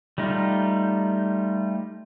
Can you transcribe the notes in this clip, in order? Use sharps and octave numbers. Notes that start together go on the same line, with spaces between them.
G3 A3 D#4 F4